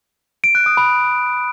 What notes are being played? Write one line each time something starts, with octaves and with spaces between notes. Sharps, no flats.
D7
F#6
D#6
B5